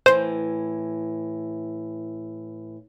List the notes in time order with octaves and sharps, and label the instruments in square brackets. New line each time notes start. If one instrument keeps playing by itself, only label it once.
[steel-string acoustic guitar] A2 E3 [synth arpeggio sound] C5